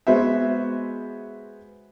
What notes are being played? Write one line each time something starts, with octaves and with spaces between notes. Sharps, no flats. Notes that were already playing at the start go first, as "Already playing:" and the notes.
G#3 B3 F#4 C5 E5